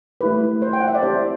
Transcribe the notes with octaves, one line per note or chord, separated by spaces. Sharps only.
A3 E4 G4 B4
C5
G5
F#5
E5
D5
C4 E4 G4 C5